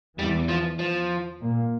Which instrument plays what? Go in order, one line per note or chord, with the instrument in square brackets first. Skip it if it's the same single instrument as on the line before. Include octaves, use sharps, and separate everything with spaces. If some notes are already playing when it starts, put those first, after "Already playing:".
[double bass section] E2 E3 [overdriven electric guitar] G3
[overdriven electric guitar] F3
F3
[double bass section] A#2 A#3